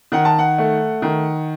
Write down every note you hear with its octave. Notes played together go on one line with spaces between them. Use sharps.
D#3 F#5
A5
F#5
A3
D#3